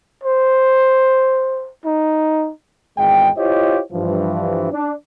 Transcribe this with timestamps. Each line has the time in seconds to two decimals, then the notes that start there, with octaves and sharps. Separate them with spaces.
0.24 C5
1.85 D#4
2.98 G#1 E2 G#3 G5
3.37 E4 F4 G4 C5 C#5 D#5
3.92 G2 E3 F3
4.72 D4